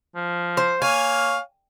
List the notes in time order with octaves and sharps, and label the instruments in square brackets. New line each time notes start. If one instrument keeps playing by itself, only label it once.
[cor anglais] F3
[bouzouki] C5
[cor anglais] A#3 [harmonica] C#5 F5 [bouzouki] G#5